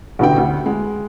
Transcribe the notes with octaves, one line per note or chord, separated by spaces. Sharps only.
A1 B2 D3 G5
D2
G#3